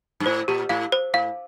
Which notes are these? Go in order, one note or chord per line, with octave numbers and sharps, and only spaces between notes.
G2
A2 C5
A#2 G4
A2 F5
C5
A2 F5